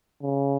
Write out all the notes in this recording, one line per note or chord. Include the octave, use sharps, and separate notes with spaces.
C#3